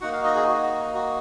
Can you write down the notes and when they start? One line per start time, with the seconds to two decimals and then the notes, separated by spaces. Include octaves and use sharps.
0.01 A#3 D#4 F#4 F#5
0.13 F5
0.24 D#5
0.35 G#4
0.48 F#4
0.95 F#4